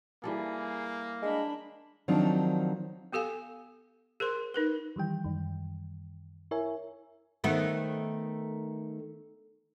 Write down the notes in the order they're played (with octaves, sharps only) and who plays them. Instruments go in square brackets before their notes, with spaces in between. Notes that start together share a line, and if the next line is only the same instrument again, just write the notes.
[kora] E3 G3 A4 [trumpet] A#3 [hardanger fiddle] G#4
[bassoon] G#3 [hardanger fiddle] D4 B5
[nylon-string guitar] D#3 F3 F#3 C4 D4
[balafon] B3 G4 A4 F5 G#5
G#4 A#4 C5 C6
D#4 A#4 B4
[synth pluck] D#3 E3 G3 G5
F#2 D#3
E4 A#4 C#5 E5 G#5
[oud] D#3 A3 B3